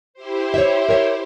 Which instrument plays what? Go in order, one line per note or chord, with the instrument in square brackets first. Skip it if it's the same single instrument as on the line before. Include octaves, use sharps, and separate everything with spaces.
[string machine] E4 G4 C5
[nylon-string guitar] C#5 E5
A#4 C#5